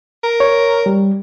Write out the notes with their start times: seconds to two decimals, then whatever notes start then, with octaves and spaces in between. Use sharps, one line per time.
0.23 A#4
0.40 C#5
0.86 G3